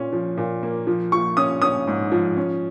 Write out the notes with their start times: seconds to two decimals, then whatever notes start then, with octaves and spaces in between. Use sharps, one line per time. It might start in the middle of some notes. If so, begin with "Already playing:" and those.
Already playing: A#2 C#4
0.13 F3
0.37 A#2
0.63 A#3
0.87 F3
1.12 F3 C#6
1.37 C#4 D#6
1.62 C#4 D#6
1.87 G#2
2.12 F3
2.37 C#4